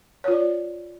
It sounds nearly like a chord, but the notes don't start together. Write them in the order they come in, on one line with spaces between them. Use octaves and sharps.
C#5 F4 D5